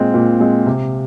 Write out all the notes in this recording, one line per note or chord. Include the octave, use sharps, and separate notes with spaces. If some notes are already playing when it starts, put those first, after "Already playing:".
Already playing: A#2 G#3 C4
A#2
G#3 C4
C3